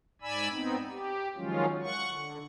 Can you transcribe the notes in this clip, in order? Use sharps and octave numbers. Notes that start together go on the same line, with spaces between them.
G#2 D5 G#5 B5 E6
B3 C4 D#4
G4
D#3 F3 F#3 G#3 C#4 F4
F#5 C#6
D3